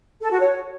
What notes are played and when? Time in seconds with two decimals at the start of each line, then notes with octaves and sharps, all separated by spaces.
0.21 A4
0.31 F#4
0.41 C#5